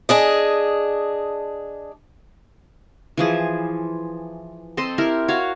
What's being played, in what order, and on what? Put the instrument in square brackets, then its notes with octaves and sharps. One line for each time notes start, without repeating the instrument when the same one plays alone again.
[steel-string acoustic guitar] D4 G#4 D#5
[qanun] E3 F3 G#4
C4 A4 D#5 C6
E4 G4 A#4
F#4 C#5 F5